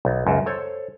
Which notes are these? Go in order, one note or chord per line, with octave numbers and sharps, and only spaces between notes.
B1
C#2 F#2
A4 C5 C#5